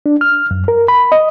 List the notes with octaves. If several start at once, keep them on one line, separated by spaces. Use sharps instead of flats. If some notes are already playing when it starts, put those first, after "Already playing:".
D4
F6
F#2
A#4
B5
D#5